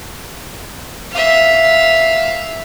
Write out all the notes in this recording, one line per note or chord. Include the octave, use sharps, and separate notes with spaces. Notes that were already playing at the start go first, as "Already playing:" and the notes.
E5 F5